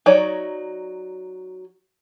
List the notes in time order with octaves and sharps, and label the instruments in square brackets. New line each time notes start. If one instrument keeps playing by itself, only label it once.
[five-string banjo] F#3 D#4 C#5 D5